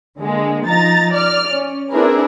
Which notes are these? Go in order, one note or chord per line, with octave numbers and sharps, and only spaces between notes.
D3 G#3 A#3
F3 D#4 A#5 A6
D5 F6
C#4
C4 D4 E4 G#4 A#4 B4